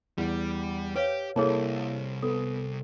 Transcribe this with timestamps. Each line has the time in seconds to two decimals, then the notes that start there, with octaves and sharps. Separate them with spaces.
0.18 E2 G3
0.96 G4 B4 C#5 F5
1.36 C2 A#3 E4 G#4 A4 C#5 A5
2.23 B3 A4